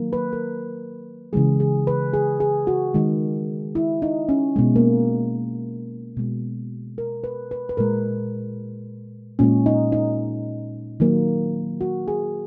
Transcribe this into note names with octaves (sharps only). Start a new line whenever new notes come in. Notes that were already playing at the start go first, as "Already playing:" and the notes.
Already playing: D#3 F#3 A#3
B4
A#4
C#3 E3 G#3 G#4
G#4
B4
G#4
G#4
F#4
D#3 G#3
E4
D#4
C#4
B2 G#3
A#3
B2 G#3
A#4
B4
B4
B4
A#2 G#3 A#4
A#2 G#3 C#4
D#4
D#4
D#3 F#3 A#3
F#4
G#4